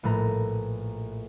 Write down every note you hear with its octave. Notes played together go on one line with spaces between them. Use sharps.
A#1 A2 A3 B4 A#5